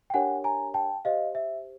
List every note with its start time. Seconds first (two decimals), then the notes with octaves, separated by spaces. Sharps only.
0.10 G5
0.14 D4 G4 A#4 C#5 F#5 G#5
0.44 G#5 A#5
0.74 G5 A5
1.05 G4 C5 D#5 F5
1.35 E5